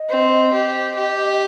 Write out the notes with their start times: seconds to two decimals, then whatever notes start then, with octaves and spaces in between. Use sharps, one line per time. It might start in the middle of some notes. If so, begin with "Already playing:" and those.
Already playing: D#5
0.09 C4
0.53 G4 D#5
0.96 G4